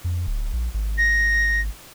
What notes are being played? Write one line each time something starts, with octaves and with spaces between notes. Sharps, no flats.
F2
D1
A#1
G#1
A#6